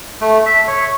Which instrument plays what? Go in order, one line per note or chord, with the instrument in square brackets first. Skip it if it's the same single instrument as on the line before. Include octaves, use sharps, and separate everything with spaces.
[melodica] A3
E5
C#5